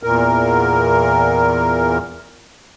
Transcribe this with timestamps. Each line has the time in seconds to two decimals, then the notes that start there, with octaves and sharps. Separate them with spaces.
0.03 E2 A#2 A#4